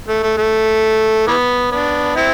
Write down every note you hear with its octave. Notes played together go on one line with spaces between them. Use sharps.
A3
A3
A3
E3 B3
B3 D4
C4 E4